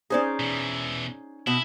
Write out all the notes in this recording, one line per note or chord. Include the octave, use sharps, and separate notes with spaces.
C#4 D#4 G#4 C5 D5
B2 E3
B2 E4